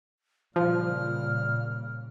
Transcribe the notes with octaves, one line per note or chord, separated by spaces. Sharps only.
A#2 C#3 F3 G3 F6